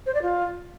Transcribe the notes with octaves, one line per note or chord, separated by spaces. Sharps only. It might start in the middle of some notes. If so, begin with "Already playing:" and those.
C5
D5
F4